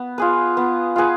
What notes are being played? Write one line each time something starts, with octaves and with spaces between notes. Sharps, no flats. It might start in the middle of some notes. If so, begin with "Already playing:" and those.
Already playing: B3
F4 G#4 B4
B3
F4 G#4 B4